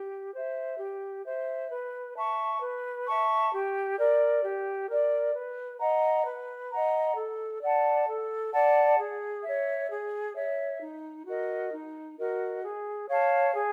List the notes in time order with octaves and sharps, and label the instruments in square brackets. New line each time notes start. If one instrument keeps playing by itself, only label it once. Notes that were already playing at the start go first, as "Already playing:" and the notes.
Already playing: [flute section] G4
C5 E5
G4
C5 E5
B4
E5 A5 C#6
B4
E5 A5 C#6
G4
A#4 D5
G4
A#4 D5
B4
D#5 F#5 A#5
B4
D#5 F#5 A#5
A4
D5 F#5 A5
A4
D5 F#5 A5
G#4
C#5 E5
G#4
C#5 E5
D#4
F#4 A#4 D#5
D#4
F#4 A#4 D#5
G#4
C#5 F5 A5
G#4